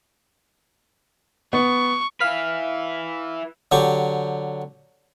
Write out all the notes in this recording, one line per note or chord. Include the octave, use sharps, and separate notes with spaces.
B3 C#6
E4 B4 F5 F6 B6
D3 F#3 G4 C#6